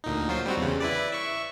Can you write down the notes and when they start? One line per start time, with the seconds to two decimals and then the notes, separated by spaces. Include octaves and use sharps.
0.04 D2 A#2 D#4
0.29 F#3 F4 C5
0.46 G3 C4 F#4
0.58 E2 C#3
0.80 E4 B4 D5
1.12 E5 C#6